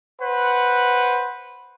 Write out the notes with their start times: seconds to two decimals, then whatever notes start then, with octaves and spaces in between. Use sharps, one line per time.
0.22 B4 C5 F#5